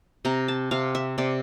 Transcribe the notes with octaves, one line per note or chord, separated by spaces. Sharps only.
C3 A#5
A5
C3 F5
E5
C3 D5